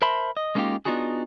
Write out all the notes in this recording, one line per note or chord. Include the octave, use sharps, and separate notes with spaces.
A#4 C5 E5 A5 B5 C6
D#5
G#3 A#3 C#4 D#4 F4 G4
B3 D4 D#4 F4 F#4 G#4